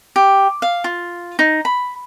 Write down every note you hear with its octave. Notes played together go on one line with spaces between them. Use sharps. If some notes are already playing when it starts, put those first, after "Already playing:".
G4
F5
F4
D#4
B5